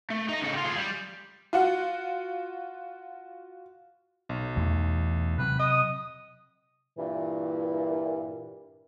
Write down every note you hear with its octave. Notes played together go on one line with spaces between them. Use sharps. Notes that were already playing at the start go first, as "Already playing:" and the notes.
A3
D#4 A#5
C#3 A4
G3 F4
F4 G#4
G3
F4 F#4 F#5
B1
E2 E3 A3
C3 F#3 C4 B4
D#5 D#6
G2 A#2 E3